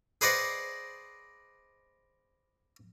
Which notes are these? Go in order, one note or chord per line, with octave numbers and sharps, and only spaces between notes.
G#4 B4 C5 D5 D#5 F#5